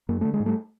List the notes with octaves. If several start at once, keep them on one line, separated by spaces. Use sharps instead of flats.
F#2 A#3
D3 A3
G#3
G#2
G3 A3